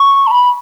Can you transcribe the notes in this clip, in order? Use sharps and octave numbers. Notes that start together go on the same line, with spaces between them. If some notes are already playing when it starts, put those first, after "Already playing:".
Already playing: C#6
A5
B5